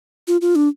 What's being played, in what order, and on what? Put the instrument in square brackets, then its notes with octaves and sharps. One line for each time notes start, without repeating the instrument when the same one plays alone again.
[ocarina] F4
F4
D4